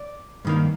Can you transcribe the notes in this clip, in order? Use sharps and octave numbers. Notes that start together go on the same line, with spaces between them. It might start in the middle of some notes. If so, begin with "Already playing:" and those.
Already playing: D5
G2 D#3 A#3